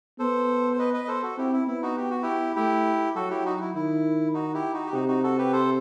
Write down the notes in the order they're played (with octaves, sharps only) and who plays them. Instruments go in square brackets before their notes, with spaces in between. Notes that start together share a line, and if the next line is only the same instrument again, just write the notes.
[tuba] B3 [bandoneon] A4 C5
[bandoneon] C5
B4 D#5
B4 D#5
D#5
A4 C5
F#4 A4
[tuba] C4 [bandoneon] E4 G4
[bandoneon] E4
[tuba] B3 [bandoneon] E4
[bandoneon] D#4 F#4
G4
F#4
E4 G4
[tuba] A3 [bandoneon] E4 G4
[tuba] F#3 [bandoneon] F#4 A4
[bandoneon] E4 G4
D#4 F#4
E4
[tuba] D#3 [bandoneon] E4
[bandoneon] D#4 F#4
E4 G4
D#4 F#4
G4
[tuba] C3 [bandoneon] D#4 F#4
[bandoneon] D#4 F#4
F#4 A4
G4 B4
A4 C5